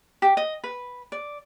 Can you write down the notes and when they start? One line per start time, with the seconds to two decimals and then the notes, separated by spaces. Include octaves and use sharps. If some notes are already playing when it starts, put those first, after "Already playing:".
0.22 G4
0.37 D#5
0.64 B4
1.12 D5